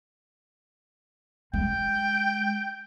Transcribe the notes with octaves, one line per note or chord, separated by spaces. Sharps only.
G#3 G5